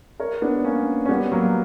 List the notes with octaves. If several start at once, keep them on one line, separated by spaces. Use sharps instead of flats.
A#4 C#5
B3 D4
A#3 C#4
C#4
G3 B3
F#3 A#3